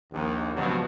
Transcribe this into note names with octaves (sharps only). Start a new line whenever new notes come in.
A#1 D#2
C#2 G2 B2 F3 F#3